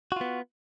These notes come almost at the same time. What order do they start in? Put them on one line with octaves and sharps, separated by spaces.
F#4 F4 B3